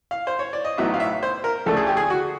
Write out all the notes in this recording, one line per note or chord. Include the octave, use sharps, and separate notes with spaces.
F5
C5
C#5
D5
D#5
A1 A2 F#3 B3 D#4 E5
F5
E5
C5
A#4
D2 C#3 F3 A3 D4 A4
G#4
G4
G#4
F#4